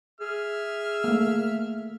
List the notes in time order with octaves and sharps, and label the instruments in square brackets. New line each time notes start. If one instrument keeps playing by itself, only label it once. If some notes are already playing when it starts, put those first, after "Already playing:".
[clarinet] G#4 [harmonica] E5 F6
[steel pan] A3 A#3